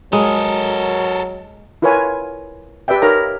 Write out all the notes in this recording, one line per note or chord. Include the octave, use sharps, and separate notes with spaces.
F#3 G#3 A4 A#4
E4 F4 A#4 B4 C#5 G#5
G4 B4 D5 E5 G5
D#4 A#4 C#5 E5 A#5 B5